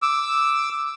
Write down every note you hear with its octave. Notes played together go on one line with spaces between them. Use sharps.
D6 E6